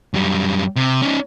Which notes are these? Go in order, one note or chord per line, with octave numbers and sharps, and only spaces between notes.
F#2 G3
C3
C#4 D#4